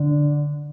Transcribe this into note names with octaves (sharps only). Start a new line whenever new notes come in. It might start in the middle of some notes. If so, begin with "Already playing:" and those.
Already playing: D3